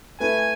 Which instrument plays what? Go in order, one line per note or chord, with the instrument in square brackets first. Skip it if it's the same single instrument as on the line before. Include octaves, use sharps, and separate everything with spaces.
[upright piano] A3 E4 B4 [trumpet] G#5